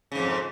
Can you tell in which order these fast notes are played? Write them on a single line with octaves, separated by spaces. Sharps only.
C#3 G#2 F2